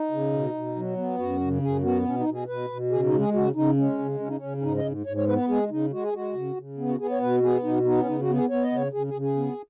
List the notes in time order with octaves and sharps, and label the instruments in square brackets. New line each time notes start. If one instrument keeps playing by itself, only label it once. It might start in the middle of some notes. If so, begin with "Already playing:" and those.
Already playing: [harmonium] D#4
C#3
B2
B2
F#3
B3
F#2 F#4
C#3
F#2 G#4
B3 F#4
B2 C#4
D#4
B2
G#4
B2 B4
B2
C#3 G#4
D#4
G#3
G#4
C#3 F#4
C#3 D#4
G#3 C#4
C#3
C#3 C#4
D#4
C#3 C#4
C#4
G#2 D#4
D#5
G#2
G#2 C#5
C#5
B3 B4
B4
G#3 G#4
C#3 D#4
G#3 F#4
G#4
G#3 F#4
C#3
C#3
B3
F#4
B3 G#4
C#5
B2 B4
B3 G#4
B2 D#4
B3 D#4
C#4
C#3 D#4
F#4
B3
G#4
B3 C#5
D#5
C#3 C#5
C#3 G#4
G#4
C#3
G#4
B3